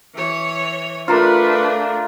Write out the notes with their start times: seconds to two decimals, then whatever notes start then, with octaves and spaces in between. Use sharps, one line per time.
0.15 E3 C#5
1.08 A3 D4 F4 A#4 B4 C6